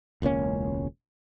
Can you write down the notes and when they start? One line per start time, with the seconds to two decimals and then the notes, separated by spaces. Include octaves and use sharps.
0.22 E1 C#2 A#3 C#4